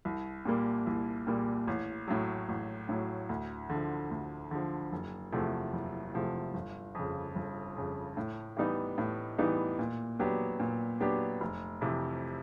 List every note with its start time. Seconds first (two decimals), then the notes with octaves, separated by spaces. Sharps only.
0.05 C2
0.45 A#2 G3 A#3
0.87 C2
1.27 A#2 G3 A#3
1.67 A1
2.08 A2 F#3
2.49 A1
2.89 A2 F#3
3.29 D2
3.70 D3 F3
4.11 D2
4.51 D3 F3
4.92 F#1
5.32 E2 C3 F3 A3
5.73 F#1
6.14 E2 C3 F3 A3
6.54 G1
6.95 F2 C#3
7.36 G1
7.76 F2 C#3
8.17 A2
8.57 E3 G3 B3 D#4
8.98 A2
9.39 E3 G3 B3 D#4
9.79 A#2
10.19 F#3 B3 D4 G4
10.60 A#2
11.00 F#3 B3 D4 G4
11.41 F1
11.81 F2 C3 E3